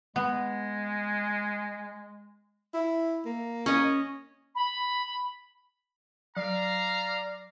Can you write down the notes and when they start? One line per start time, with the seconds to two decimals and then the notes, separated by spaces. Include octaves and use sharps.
0.16 G#3 B3
2.74 E4
3.26 A#3
3.66 C#4 D#5
4.55 B5
6.36 F#3 D5 F5 A#5